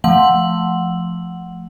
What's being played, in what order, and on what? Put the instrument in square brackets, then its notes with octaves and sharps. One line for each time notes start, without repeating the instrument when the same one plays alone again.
[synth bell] F3 A3 F#5 F#7